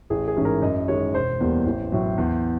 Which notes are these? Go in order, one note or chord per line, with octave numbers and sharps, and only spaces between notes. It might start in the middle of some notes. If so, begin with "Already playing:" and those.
A1 G#4
G#4
G#2 E3 G#3 C#4
A#4
F#2 D#5
D#3 G#3 C#5
E1 C5
E2 B2 G3 A#3
A1
A2 F#3
E2